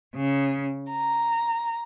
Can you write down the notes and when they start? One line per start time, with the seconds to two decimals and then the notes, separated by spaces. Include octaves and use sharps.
0.16 C#3
0.90 A#5